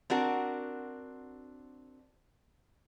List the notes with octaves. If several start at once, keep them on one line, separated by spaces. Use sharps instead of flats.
C4 D4 F#4 A#4